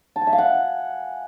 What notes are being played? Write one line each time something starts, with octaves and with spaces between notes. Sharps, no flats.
A5
G#5
E5
F5
F#5